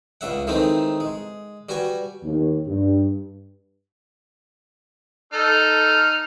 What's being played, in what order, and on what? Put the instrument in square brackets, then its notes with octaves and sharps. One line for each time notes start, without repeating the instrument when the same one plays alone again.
[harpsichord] C#2 C#3 E5 F#5
D#3 E3 G#3 A3 C4 D#4
G#3
G3 F#4 B4 G#5
[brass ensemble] D#2
G2
[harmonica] D#4 F6 [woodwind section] A4